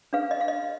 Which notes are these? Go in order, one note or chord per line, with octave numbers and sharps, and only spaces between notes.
D4 G#4 B4 F5
D#5
F5
D#5